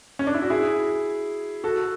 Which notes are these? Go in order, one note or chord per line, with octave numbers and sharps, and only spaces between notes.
C#4
D4
E4
F#4
E4 G#4
F#4 A4